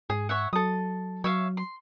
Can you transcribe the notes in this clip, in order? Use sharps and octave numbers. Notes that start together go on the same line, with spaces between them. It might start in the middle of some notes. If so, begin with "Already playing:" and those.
G#2 G#4
C#5 E5 F#5
F#3 A4 D#6
F#3 C#5 E5 F5
C6